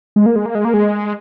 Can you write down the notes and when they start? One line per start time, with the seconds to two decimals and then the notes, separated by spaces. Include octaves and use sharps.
0.16 G#3
0.26 A#3
0.36 G#3
0.46 A#3
0.55 G#3
0.65 A#3
0.74 G#3